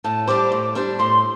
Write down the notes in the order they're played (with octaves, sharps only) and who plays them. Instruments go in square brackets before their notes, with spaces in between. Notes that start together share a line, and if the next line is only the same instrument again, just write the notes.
[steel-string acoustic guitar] A2 [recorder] A5
[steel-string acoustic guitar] G3 D4 G4 C5 [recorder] D6
[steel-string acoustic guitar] A2
G3 D4 G4 C5
[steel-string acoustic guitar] A2 [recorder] C6